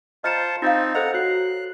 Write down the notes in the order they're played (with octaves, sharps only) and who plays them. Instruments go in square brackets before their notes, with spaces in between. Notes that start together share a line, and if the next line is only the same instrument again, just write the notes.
[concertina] F4 C5 A5 [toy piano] D#5 A#5 [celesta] F6 C#7 E7
[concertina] C4 D#4 [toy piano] F4 F5 [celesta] G6 A6
[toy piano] A4 C5 D#5 [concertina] F#5 A#5
[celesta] F#4 C#5 C7 [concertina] F#6